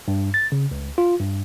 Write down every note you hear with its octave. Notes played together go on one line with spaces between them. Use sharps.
G2
A6
C#3
C#2
F4
G2